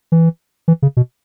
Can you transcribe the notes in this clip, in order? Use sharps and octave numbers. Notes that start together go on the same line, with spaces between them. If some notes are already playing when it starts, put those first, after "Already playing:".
E3
E3
C#3
B2